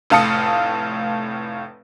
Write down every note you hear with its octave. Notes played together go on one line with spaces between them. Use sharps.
F1 A2 F5 A5 D#6 C#7